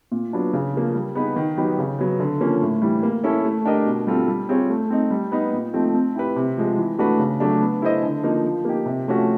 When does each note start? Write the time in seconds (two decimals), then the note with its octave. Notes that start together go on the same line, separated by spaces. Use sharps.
0.12 A#2
0.32 F#3 B3 D4 F4
0.53 C#3
0.74 F3 A#3
0.95 G3
1.15 B3 D#4 G#4 B4
1.36 D#3
1.58 F#3 B3 D#4 G4
1.78 C#3
1.99 F#3 B3
2.20 D3
2.40 F3 A#3 C#4
2.62 A2
2.82 E3 G3
3.03 A#3
3.24 C#4 E4 A4
3.45 A3
3.65 D4 G4 A#4 D#5
3.86 B2
4.07 G3 C4 F4 A4
4.28 G3
4.49 C4 F4 G#4 C#5
4.70 A3
4.90 C4 D#4
5.11 G3
5.32 B3 D#4
5.53 A#2
5.73 F3 A3 C4 D#4
5.95 C4
6.15 E4 G4 B4
6.36 C3
6.57 F3 G#3
6.78 E3
6.99 A3 D4 F#4 B4
7.19 C#3
7.40 F#3 A3 D4
7.61 B3
7.82 E4 A4 C5 D#5
8.02 D3
8.23 F3 A#3 D#4
8.44 F3
8.65 A#3 D#4 G4
8.86 C3
9.07 F3 A3 C#4 F#4